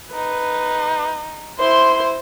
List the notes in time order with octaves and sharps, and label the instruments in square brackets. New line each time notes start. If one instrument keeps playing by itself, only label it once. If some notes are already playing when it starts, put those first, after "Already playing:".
[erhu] D#4 [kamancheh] B4
[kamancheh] E4 [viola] C5 [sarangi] C6